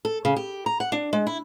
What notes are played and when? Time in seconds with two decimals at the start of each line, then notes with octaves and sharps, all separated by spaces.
0.05 A4
0.25 C#3
0.36 G4
0.66 A#5
0.80 F#5
0.92 D4
1.13 G#3
1.27 E4